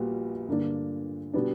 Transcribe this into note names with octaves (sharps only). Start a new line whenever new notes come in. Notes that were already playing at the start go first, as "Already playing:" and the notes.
Already playing: A#1 A#2 G3 B3 F#4
G2 D3 A#3 D4
B2 G3 B3 D4